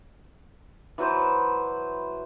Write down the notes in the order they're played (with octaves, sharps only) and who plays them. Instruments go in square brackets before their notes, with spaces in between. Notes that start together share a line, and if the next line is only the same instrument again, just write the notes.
[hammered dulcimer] E3 F#3 B4 C5